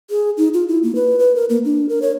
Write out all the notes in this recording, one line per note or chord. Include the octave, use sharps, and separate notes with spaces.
G#4
D#4
F4
E4
A#3
B4
B4
A#4
A#3
D4
A#4
C#5